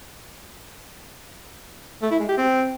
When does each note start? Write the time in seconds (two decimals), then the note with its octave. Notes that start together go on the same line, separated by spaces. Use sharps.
2.02 A3
2.11 E4
2.20 G#3
2.29 G4
2.37 C4